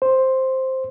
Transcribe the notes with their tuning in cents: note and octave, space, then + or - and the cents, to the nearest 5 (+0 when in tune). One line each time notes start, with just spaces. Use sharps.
C5 +5